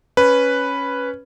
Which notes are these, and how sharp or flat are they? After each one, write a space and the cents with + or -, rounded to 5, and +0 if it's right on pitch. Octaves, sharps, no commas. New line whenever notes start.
C#4 +0 B4 +0